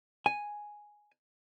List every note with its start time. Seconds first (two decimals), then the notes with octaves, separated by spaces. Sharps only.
0.26 G#5